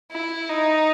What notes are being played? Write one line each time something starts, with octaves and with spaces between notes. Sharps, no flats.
E4
D#4